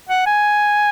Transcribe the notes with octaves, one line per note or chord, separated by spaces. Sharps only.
F#5
G#5